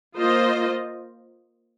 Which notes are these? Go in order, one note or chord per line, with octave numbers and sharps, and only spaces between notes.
A#3 F4 C5 D#5